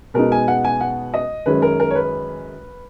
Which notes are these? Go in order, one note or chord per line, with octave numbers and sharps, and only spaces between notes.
B2 G#3 B3 D#4 A#4
G#5
F#5
G#5
F#5
D#5
F#2 D#3 G#3 C#4 B4
A#4
A#4
C#5
B4